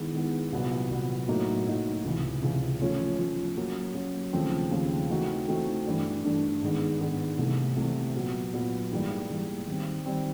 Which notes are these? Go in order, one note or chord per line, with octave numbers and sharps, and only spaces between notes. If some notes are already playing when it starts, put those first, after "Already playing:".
Already playing: D#3 G#3 B3 E4
D#3 G#3 B3 E4
C2 A#2 F#3 B3
C2 A#2 F#3 B3
A2 F#3 A#3 D#4 F#4
A2 F#3 A#3 D#4 F#4
C#2 C3 E3
C#2 C3 E3
F3 A3 C#4 F4
F3 A3 C#4 F4
F#3 A#3 C#4
F#3 A#3 C#4
D#2 C#3 F3 A3 C4
D#2 C#3 F3 A3 C4
E3 A3 C4 D#4 F#4
E3 A3 C4 D#4 F#4
G2 E3 A3 D4
G2 E3 A3 D4
G#2 D#3 G#3 B3 D4
G#2 D#3 G#3 B3 D4
C2 C3 E3 A3
C2 C3 E3 A3
A#2 F#3 B3
A#2 F#3 B3
G#2 E3 G3 A#3
G#2 E3 G3 A#3
D#3 G3 C4
D#3 G3 C4